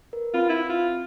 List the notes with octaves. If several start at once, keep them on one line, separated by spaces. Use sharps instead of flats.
A#4 B4
C4 F4 B4 B5
E4
F4